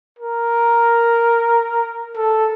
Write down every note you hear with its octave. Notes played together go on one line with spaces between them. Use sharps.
A#4
A4